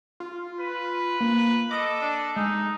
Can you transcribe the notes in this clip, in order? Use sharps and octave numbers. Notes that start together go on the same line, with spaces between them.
F4
B4
A#3
A4 D#5 D6
D4
G#3 D#4